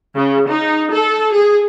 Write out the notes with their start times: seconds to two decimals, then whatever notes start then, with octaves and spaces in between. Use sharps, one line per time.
0.17 C#3
0.50 D#4
0.92 A4
1.34 G#4